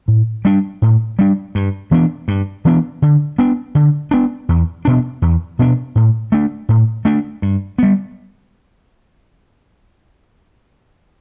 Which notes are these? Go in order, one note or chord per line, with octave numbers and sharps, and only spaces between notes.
A2
G3 D4
A2
G3 D4
G2
E3 B3 D4
G2
E3 B3 D4
D3
B3 D4
D3
B3 D4
E2
B2 B3 D4
E2
B2 B3 D4
A2
A3 D4
A2
A3 D4
G2
G3 B3